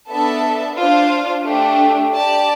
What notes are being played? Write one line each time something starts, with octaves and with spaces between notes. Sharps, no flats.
B3 D4 A4 E5 A5
D4 F4 C5 F5
A3 D4 G4
G4 D5 A5